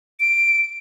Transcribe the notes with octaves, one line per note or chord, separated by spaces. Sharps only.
D7